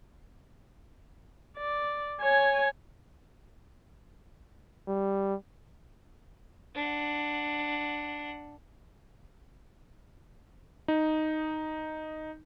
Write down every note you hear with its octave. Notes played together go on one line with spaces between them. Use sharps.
D5
C#5 G#5
G3
D4 F#5
D#4